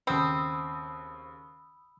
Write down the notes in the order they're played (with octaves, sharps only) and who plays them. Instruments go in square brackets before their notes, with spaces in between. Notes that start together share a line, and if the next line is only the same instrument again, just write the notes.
[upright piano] D#2 C#3 [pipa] C4 [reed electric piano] B5 D#6 E6